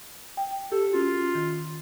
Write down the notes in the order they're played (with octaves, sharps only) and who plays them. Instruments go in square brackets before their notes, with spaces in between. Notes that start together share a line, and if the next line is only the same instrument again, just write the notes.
[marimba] G5
[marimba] G4 [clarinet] A4
[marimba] C#4 F#4 [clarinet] F4
[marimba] D#3